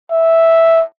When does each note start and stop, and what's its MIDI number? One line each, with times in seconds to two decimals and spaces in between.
0.11 0.82 76